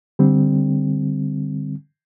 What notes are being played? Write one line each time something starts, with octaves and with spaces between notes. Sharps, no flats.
D3 G3 C4